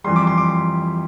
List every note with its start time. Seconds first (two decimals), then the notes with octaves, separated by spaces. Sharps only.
0.04 F2 E3 G3 C6
0.16 D6
0.27 C6
0.38 D6
0.49 C6